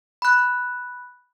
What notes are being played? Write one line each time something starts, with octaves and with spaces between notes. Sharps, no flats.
B5 F#6